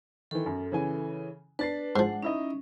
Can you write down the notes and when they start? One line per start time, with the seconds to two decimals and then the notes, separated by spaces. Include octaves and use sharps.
0.31 D#3 E3 A4
0.46 F#2
0.72 C#3 E3 G#5
1.59 D4 B4 A6 C7
1.96 G#2 F3 G#3 F#5
2.23 C#4 D#4 E4 D#5